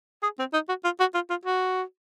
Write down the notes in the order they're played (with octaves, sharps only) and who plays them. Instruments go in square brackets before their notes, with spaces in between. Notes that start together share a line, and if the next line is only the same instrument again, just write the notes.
[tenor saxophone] G#4
C4
D#4
F#4
F4
F#4
F4
F4
F#4